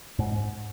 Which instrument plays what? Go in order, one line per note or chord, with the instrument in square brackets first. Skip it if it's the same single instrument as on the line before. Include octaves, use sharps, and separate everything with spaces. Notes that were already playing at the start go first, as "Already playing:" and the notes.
[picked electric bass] G#2